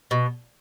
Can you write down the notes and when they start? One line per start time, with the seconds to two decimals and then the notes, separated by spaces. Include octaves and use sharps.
0.11 B2